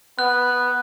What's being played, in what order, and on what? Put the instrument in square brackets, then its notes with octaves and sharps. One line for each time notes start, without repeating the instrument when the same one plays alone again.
[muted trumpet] B3 [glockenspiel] F#6